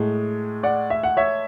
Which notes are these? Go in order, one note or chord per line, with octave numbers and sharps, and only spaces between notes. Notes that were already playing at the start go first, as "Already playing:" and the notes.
Already playing: A2 G#3
D5 F#5
E5
F#5
C#5 E5